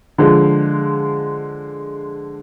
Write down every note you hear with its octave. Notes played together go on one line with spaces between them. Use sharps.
D3 F3 G#3